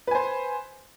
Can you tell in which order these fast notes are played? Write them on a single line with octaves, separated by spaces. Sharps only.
B4 G#5 C5